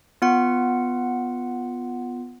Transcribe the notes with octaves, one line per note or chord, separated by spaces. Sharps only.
B3 F4 F#5